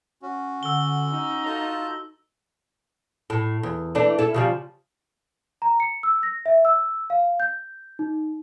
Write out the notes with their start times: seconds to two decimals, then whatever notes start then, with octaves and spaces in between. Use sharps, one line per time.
0.22 C#4 F#4
0.63 D3 E6 G7
1.11 D#4
1.46 F4 F#4 A4 A5 G6
3.30 A2
3.63 E2
3.95 E3 A3 D4
4.18 E4 A4
4.34 C#3 F3 G3
5.62 A#5
5.80 C#7
6.03 E6
6.23 A#6
6.46 E5
6.65 E6
7.10 F5
7.40 G6
7.99 D#4